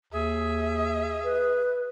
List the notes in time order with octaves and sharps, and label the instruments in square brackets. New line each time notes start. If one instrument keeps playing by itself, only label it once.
[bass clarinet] D#2 [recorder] G#4 [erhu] E5
[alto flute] B4